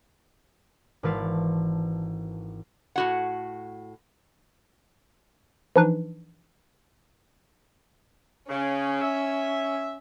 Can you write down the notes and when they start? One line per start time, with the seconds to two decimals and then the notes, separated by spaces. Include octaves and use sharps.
1.03 G#1 E3 E4 B4 F5 A5
2.96 A2 F#4 F#5
5.76 E3 F3 D4 D#4 B4
8.50 C#3 C#4
9.01 E5